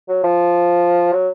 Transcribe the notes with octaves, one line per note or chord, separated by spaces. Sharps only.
F#3
F3
F#3